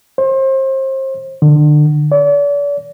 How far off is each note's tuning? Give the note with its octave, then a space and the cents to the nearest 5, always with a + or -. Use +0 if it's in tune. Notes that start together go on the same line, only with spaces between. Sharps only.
C5 +30
D3 +25
D5 -40